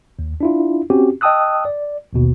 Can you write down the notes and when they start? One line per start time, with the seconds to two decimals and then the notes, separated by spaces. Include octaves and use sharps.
0.19 D#2
0.41 D4 E4 F4
0.90 C4 C#4 F#4 G4
1.21 D#5 G5 A5 D#6 E6 F#6
1.65 D5
2.13 A1 D#2 B2